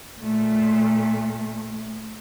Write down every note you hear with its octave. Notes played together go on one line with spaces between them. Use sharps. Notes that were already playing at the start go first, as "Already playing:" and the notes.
A#2 A3